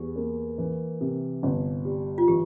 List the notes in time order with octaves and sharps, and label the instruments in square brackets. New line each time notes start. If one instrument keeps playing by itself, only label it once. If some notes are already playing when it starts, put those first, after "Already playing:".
Already playing: [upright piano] E2 [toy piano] G4
[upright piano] A#3
E3
C3
G1
G3
[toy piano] F4
[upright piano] E3 [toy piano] G4